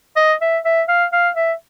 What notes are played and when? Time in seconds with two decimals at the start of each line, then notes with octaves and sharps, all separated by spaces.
0.17 D#5
0.42 E5
0.65 E5
0.89 F5
1.13 F5
1.36 E5